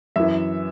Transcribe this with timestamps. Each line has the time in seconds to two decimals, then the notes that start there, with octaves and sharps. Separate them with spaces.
0.16 F#2 E3 E5